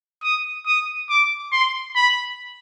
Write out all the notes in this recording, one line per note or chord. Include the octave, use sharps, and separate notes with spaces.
D#6
D#6
D6
C6
B5